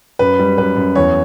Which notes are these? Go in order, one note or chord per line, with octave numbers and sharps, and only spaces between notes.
F#2 B4
G3
F#2 B4
F#2
E2 C#5